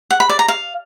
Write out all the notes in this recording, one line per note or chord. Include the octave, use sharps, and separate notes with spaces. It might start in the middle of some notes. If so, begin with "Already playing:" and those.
F#5
B5
D5
A#5
F5